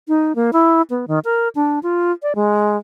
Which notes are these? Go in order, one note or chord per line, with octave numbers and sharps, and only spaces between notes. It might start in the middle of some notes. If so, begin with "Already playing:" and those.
D#4
A#3
E4
B3
D#3
A#4
D4
F4
D5
G#3